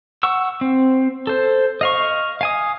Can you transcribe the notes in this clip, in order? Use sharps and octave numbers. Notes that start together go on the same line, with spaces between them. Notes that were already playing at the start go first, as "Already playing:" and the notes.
F#5 C#6 E6
C4
A4 C5
D#5 F5 C#6
F5 G#5 D#6